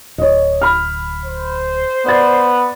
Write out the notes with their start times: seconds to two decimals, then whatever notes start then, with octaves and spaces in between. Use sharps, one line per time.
0.18 D1 C#5 D#5
0.61 B5 F6
1.25 C5
2.06 B3 D5 A6